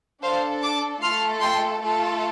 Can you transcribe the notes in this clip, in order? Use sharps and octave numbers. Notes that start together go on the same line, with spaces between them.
D4 A4 C5 F5
A5 D6
A3 F4 A4 C6 F6
G5 C6
A3 F4 A4